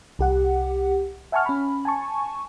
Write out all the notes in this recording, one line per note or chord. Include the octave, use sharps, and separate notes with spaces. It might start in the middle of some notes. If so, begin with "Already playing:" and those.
C2 G4 F#5
E5 F#5 G#5 A5 C#6 F6
C#4 B5
G#5 A5 C#6